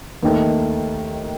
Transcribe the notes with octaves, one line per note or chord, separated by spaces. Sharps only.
D#2 D#3 A3